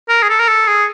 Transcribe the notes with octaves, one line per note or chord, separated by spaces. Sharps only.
A#4
G#4
A4
A#4
A4
G#4